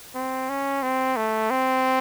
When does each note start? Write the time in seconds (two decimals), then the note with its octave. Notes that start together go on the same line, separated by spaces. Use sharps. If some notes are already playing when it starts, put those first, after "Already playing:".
0.15 C4
0.49 C#4
0.83 C4
1.17 A3
1.50 C4